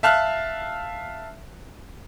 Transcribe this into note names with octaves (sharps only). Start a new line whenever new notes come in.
E5 F5 A5 F6 F#6